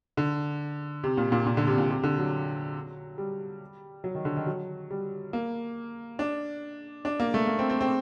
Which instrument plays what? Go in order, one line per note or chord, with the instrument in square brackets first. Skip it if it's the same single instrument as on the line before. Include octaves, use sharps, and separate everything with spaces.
[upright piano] D3
C3
A#2
A#2
A#2
D3
C3
A#2
C3
D3
F#3
G3
F#3
D#3
D3
D#3
F#3
G3
A#3
D4
D4
A#3
A3
A#3
C4
C4
C4